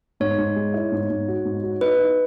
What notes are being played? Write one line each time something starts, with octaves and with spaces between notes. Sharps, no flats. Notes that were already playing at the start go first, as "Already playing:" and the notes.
G#2 C#5
G#2
G#3
E4
G#2
G#2
F#4
G#2
F#4
D#4 B4
D#4